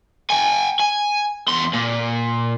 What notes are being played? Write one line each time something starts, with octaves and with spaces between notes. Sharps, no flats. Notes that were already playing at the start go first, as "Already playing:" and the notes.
G5 G#5
G#5
E2 C6
A#2